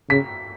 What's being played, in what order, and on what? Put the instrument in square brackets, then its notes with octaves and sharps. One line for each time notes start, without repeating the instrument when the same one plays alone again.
[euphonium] C#3 [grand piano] B6